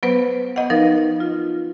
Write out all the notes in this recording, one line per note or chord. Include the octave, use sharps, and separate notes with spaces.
F#3 B3 B4 C5
B3 D#5 F#5
F3 D#4 A#4 B4
F4